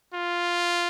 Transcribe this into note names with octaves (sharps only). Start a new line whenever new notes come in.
F4